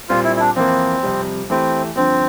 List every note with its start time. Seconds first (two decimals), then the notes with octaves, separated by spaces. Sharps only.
0.09 A#2 G3 C4 F4
0.24 E4
0.36 E4
0.40 D4
0.56 F2 E3 A#3 C4
1.03 F2 C3 G3
1.50 E3 A3 C4 E4 G4
1.96 G2 D3 F3 C4